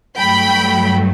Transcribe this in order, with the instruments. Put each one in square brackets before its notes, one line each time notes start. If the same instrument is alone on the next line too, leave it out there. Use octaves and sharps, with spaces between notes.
[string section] G2 F#3 A3 G5 B5